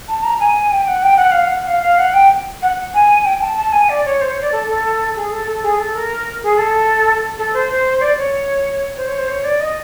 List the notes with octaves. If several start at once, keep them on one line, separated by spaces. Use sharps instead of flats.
A5
A#5
G#5
G5
F#5
G5
F#5
F5
F#5
F5
F5
F#5
G5
F#5
G#5
G5
A5
A5
G#5
D5
C#5
C5
C#5
D5
A4
A4
G#4
A4
A4
G#4
A4
A#4
G#4
A4
A4
C5
C5
D5
C#5
C5
C#5
C5
C#5
D5
D#5